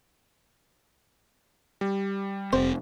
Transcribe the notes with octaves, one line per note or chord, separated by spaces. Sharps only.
G3
F1 C4 C5